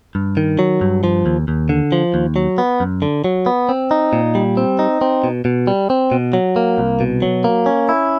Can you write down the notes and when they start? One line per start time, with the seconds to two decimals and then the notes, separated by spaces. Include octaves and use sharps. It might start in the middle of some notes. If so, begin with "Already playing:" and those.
0.15 G2
0.37 D#3
0.59 F#3
0.81 G2
1.04 F3
1.26 D#2
1.48 D#2
1.69 D3
1.92 F3
2.14 D#2
2.36 F#3
2.58 B3
2.80 F#2
3.02 D3
3.24 F#3
3.46 B3
3.69 C4
3.91 D#4
4.13 A#2
4.35 G3
4.57 C4
4.79 D#4
5.01 C4
5.24 B2
5.45 B2
5.67 G3
5.90 C4
6.12 B2
6.33 F#3
6.56 A#3
6.78 C2
7.00 B2
7.22 F#3
7.44 A#3
7.66 C#4
7.89 E4